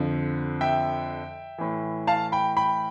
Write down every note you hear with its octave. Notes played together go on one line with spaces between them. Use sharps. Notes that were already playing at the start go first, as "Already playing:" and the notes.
Already playing: F2 D3 F3
E5 G5
A2 E3
F5 A5
G5 B5
G5 B5